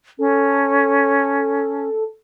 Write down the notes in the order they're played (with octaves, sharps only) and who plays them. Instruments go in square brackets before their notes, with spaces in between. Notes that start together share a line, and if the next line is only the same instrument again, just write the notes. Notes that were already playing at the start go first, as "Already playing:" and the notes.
[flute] C#4 [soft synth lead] A4